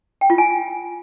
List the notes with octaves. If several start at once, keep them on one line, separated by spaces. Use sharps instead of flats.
G5
F4
G#5